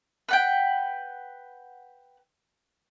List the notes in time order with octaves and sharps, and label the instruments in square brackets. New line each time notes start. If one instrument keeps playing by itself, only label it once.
[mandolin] B4 F#5 G5